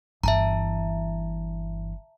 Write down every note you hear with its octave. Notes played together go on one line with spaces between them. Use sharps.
G1 E3 E5 A5 A#5